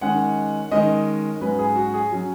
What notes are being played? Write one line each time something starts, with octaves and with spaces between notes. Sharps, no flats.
D#3 G#3 C#4 F#5
D#3 G#3 C#4 D#5
G#2 F#3 C#4 B4
G#4
F#4
G#4
F#3 C#4